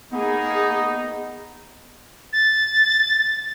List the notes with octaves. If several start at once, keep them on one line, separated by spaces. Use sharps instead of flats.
A#3 B3 D#4 G#4
A6